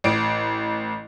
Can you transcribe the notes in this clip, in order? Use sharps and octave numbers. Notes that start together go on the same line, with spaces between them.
A1 D7